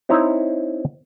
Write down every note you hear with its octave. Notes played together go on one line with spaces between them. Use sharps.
C4 D#4 E4 C#5 A#5